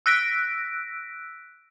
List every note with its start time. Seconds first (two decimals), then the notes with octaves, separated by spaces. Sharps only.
0.06 E6 F#6 A#6 B6 D7